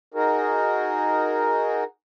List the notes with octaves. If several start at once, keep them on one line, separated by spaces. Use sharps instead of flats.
D#4 F#4 G#4 A#4